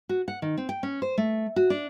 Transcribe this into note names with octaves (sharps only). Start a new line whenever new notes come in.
F#4
F#5
D#3
C4
G5
C#4
C5
A3
F#4
D4